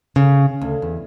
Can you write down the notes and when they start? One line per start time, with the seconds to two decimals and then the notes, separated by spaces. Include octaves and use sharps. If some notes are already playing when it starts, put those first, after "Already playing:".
0.16 C#3
0.62 D2
0.82 E2